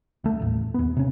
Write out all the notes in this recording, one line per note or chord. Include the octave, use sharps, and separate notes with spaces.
D2 A3
D#1 A1
D#2 B3
C3 C#4